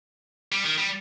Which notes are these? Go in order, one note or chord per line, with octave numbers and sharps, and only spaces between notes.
G3
D#3
G3